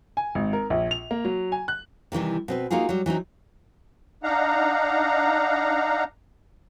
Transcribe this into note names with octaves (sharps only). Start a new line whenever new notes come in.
G#5
G#1
A#4
A#1
F7
A#3
F#3
G#5
F#6
C3 D#3 E3 G3
B2 C4 B4
A#3 D#4 F4 F#4 G#4
F#3 G3
E3 F#3 C4 D#4
D4 D#4 F5 F#5 A#5